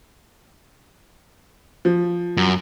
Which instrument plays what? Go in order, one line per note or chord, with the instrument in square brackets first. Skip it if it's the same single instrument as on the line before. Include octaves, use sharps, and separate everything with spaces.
[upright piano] F3
[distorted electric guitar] F#2